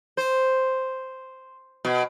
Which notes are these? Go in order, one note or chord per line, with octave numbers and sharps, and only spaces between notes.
C5
B2